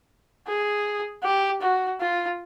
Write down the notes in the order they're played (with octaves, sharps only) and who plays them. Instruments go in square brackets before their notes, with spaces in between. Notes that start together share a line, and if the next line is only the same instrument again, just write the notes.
[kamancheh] G#4
G4
F#4
F4